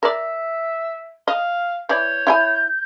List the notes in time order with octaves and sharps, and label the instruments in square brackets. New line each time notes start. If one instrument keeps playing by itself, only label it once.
[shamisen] A#4 D5 [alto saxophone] E5
[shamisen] D#5 [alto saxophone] F5
[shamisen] E3 D5 [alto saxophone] C#5 [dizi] G6
[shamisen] E4 G5 G#5